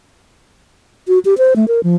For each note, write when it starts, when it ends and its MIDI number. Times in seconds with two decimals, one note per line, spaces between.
1.08 1.19 66
1.25 1.34 67
1.38 1.54 72
1.56 1.68 57
1.68 1.80 70
1.84 1.96 53